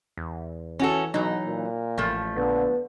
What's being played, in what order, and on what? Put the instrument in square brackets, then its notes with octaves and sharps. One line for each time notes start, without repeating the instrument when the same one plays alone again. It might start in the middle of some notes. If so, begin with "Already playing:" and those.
[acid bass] E2
[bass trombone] E3 [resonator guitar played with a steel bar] C#4 F#4 A4
[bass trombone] B1 [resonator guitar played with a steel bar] E3 D#4 [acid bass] F#3
[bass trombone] A#2
[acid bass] A1 [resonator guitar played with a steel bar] F3 A3
[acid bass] A#1 [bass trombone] D3 [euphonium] B3